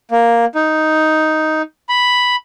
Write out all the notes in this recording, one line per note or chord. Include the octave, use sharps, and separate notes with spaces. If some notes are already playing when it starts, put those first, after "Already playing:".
A#3
D#4
B5